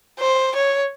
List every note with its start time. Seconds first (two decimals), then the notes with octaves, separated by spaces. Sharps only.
0.19 C5
0.55 C#5